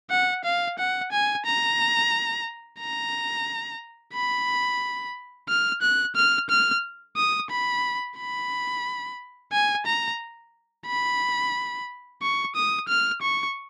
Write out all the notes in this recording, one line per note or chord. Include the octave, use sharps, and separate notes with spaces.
F#5
F5
F#5
G#5
A#5
A#5
B5
F6
F#6
F6
F6
D#6
B5
B5
G#5
A#5
B5
C#6
D#6
F6
C#6